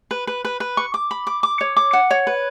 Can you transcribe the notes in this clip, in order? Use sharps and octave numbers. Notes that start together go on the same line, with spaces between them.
B4
B4
B4
B4
C#6
D6
B5
D6
D6
C#5
D6
F#5
C#5
B4